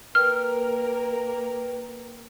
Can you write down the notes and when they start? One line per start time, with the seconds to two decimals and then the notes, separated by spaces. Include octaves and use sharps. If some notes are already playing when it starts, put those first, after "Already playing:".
0.15 A#3 A#4 B4 G5 F6